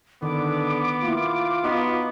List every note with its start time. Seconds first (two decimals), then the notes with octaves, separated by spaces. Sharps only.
0.23 D3 D#3 B3 D6
1.04 A#3 E4 F4
1.64 B3 D#4 F#4 D#5